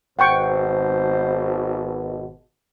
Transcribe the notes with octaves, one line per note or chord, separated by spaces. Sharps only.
G#1 B2 C5 F#5 G5 C#6